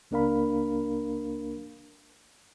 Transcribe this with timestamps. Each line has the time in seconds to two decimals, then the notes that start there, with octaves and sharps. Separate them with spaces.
0.11 C#2 A#3 D4 A#4 F5 B5